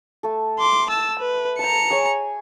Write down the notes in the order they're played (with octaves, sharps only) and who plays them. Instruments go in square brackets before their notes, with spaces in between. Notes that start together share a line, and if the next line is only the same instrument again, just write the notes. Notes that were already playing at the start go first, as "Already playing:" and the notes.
[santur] A3 A4
[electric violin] C6 D6
A5 E6
B4
[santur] G5 A5 [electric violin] A#5 C#7
[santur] G#4 C#5 G#5